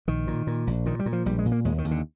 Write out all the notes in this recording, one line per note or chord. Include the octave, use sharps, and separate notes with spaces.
A#1 D#3
A#2
A#2
A#1
A#2 D#3
G3
A#2
F3
A#1 G3
G#3
A#2
A#3
D#2 G#3
D#3
D#2
D3